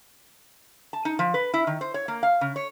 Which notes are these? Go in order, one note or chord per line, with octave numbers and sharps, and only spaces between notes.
A5
D#4
F3
B4
E4
D#3
C5
C#5
A#3
F5
C#3
C#5